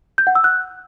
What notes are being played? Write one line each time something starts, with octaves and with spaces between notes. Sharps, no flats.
G6
F#5
E6
F#6